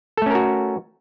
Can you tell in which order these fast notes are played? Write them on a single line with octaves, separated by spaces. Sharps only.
A4 A3 C#4 A#4 F#4